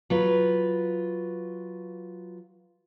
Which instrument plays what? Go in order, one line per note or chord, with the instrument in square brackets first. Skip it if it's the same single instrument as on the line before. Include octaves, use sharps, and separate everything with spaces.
[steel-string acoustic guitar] F#3 F4 B4